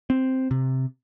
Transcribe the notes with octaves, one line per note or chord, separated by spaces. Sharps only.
C4
C3